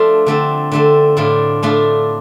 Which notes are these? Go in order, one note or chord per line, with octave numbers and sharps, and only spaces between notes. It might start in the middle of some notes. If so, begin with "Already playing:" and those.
Already playing: F3 A3 D4 F4
D3 A3 C4
D3 A3 C4
A2 A3 D4 F4
A2 A3 D4 F4